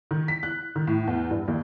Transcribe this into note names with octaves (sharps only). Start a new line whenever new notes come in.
D#3
B6
F#6
D#3
A2
E2
G2
D#2